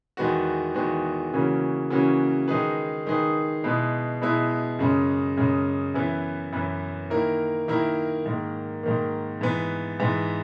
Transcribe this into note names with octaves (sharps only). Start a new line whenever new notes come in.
E2 D#3 G#3 B3 F#4
E2 D#3 G#3 B3 F#4
C#3 E3 A#3 C#4 F#4
C#3 E3 A#3 C#4 F#4
D#3 G#3 D#4 G#4 B4
D#3 G#3 D#4 G#4 B4
B2 G#3 B3 E4 G#4
B2 G#3 B3 E4 G#4
F#2 C#3 G#3
F#2 C#3 G#3
F#2 E3 B3 E4 B4
F#2 E3 B3 E4 B4
D#3 A#3 E4 A#4
D#3 A#3 E4 A#4
G#2 D#3 A#3
G#2 D#3 A#3
G#2 E3 B3
G#2 E3 B3